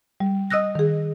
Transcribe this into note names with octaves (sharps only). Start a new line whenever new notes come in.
G3
D#5 D#6 E6 F#6 A#6
D#3 G#4